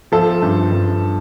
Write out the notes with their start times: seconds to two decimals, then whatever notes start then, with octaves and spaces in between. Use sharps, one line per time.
0.12 F3 A4
0.42 G2
0.72 G2